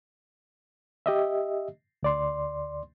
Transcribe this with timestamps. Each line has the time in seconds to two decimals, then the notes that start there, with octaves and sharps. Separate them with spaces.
1.06 G4 D#5 E5
2.03 D2 D5 C6